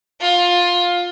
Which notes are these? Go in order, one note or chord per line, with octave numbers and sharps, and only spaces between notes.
F4